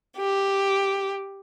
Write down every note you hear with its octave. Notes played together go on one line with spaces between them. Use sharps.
G4